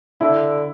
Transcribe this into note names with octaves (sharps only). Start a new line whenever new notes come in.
D3 E4